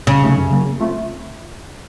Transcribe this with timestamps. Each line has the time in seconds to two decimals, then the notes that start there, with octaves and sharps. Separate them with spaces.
0.06 C2 C#3
0.21 C3 F#3 A3 D#4
0.37 F#2
0.50 C#3 F#3 A#3
0.65 C#3
0.79 A3 C4 F4